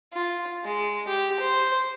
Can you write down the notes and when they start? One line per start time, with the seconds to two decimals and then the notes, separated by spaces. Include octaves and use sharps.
0.13 F4
0.64 G#3
1.08 G4
1.40 C5